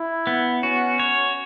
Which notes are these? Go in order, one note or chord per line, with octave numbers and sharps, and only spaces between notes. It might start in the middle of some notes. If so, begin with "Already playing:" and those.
Already playing: E4
B3
C#4 F#4
C#5